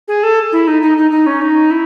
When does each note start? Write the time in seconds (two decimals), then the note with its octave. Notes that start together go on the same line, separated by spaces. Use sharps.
0.08 G#4
0.23 A4
0.52 E4
0.67 D#4
0.82 D#4
0.97 D#4
1.11 D#4
1.26 C#4
1.42 D#4
1.71 E4